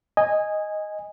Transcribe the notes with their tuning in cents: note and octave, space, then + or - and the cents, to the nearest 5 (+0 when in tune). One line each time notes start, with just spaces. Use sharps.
D#5 +0 G#5 -15